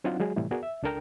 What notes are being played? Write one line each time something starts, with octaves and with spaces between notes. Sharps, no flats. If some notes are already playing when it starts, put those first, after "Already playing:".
F#3 C4 D4 D#4 F4 F#5
F#3 G#3 F#4 G#4
A2 C3 E3 G3 A3
B3 F#4 G#4 A#4 D5
E5
C#2 D4 A4 A#4 G5